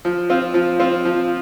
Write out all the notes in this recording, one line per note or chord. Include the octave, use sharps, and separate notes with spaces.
F3
C4 F4
F3
C4 F4
F3